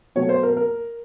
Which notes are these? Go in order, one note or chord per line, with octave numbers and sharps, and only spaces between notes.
B2 F#3 A3 C#5
C5
A#4
A#4